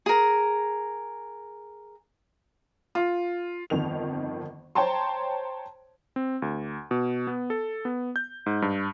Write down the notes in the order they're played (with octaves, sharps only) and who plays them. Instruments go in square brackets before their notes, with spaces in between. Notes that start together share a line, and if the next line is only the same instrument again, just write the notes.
[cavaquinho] G#4 A#4
[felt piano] F4
[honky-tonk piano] G1 F2 D#3 F7
C5 C#5 G5 A5 A#5 C6
[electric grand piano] C4
D2
B2
B3
A4
B3
G6
G#2
G2